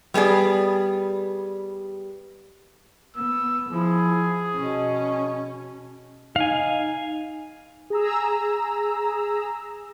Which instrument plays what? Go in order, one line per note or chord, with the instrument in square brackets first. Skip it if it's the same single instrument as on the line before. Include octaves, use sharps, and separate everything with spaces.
[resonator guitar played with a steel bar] G3 B3 G#4 D5
[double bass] B3 [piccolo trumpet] E6
[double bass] F3 [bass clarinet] E4 [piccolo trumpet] G#4
[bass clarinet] B2 [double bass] C#4
[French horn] D#4 [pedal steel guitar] F5 G#5
[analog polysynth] G#4 A#5 E6